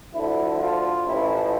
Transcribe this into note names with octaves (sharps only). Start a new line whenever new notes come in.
D2 D3 F3 E4
F4
A1 A2 F3 E4